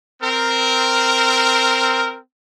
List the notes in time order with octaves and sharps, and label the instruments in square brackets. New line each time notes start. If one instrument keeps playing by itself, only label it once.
[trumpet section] C4 A#4